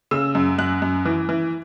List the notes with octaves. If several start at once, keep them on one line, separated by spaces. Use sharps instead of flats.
C#3 E6
F#2
F#2 F#6
F#2
E3
E3